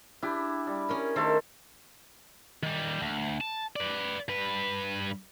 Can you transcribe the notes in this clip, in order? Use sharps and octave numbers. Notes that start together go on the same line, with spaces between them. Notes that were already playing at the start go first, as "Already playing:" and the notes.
D4 E4 G4
G3
C#4 G#4 A#4
D#3 A3 A4 A#4 C5
D#3 G3
D2
A5
B4 D5
G2 B4